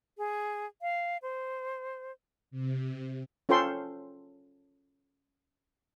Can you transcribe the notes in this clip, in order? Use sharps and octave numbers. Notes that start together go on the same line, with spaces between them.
G#4
F5
C5
C3
C#4 F4 A4 C5 G5 C6